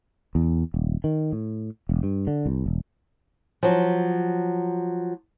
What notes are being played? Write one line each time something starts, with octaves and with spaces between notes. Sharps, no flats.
E2
D#1
D#3
A2
E1
G2
D3
C2
E1
F3 F#3